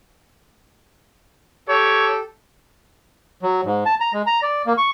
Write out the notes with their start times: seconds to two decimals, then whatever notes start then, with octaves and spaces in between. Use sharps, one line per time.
1.69 G4 A4 C#5
3.43 F#3
3.65 G#2
3.86 A5
4.00 A#5
4.14 G#3
4.27 A#5
4.42 D5
4.66 A#3
4.78 C#6